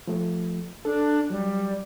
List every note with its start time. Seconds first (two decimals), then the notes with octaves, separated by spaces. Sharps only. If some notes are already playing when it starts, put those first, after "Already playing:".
0.07 F3 A3
0.85 D4 A4
1.30 F#3 G3